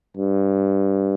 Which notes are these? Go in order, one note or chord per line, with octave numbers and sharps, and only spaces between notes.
G2